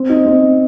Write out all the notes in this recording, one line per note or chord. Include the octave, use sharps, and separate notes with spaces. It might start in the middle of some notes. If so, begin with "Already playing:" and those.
Already playing: C4
D#4
C4